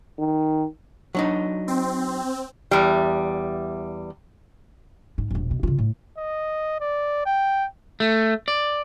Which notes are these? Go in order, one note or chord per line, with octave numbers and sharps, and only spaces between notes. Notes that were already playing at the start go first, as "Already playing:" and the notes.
D#3
F#3 D4 D#4
C4
E2 G3
G#2
E1 A#1
B2
C#3 F4
A2
D#5
D5
G5
A3
D5